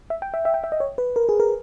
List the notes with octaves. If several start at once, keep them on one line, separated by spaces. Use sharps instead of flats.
E5
G5
E5
E5
G5
E5
D#5
C#5
B4
A#4
G#4
A#4